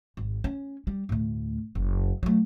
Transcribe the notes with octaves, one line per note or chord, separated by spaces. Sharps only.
G#1
C#4
G3
D2 A2
F#1
F#3 A3